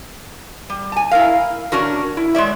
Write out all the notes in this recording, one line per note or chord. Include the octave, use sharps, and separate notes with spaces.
G3
G#5 A5
E4 A#4 F5
C#4 D4 F#4 A#4
E4
G#3 C#5 D5 E5